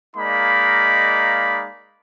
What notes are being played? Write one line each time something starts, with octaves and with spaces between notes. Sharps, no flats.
G#3 A#3 D#4 D5 F5 B5